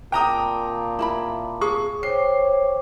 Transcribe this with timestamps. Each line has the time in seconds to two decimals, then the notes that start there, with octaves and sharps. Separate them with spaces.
0.12 A#2 C4 G5 A5 A#5 D6 D#6
0.99 E4 A#4 B5
1.61 G#4 C#6
2.03 C5 C#5 G5 D6 C7